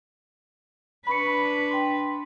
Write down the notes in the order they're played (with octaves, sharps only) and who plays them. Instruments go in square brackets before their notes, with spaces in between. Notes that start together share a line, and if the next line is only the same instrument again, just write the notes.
[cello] D4 B4 [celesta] B5 C#6 C#7
[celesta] G5 C6